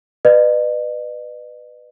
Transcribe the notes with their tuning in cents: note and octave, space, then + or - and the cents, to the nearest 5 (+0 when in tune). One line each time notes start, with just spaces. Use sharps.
B4 +5 D#5 -45